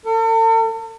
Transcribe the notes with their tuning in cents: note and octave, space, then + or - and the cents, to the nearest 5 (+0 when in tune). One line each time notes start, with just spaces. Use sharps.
A4 +45